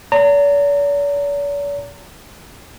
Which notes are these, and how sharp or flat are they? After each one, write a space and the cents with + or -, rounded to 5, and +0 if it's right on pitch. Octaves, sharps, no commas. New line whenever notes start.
D5 -45 A#5 -35